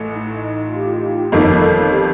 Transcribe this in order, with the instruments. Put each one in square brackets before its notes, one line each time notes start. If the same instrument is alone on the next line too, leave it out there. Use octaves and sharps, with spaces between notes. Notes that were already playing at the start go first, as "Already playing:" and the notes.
Already playing: [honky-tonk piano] A1 A2
[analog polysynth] D#4
F4
G4
[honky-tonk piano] G1 F2 D#3 A#3 [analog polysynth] A4
[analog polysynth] G4